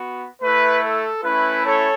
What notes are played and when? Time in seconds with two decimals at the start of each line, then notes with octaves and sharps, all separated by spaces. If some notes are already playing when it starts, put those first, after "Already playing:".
Already playing: B3 F#4
0.42 A3 E4 B4
0.83 A4
1.24 A3 C#4 E4 B4
1.65 A4 C#5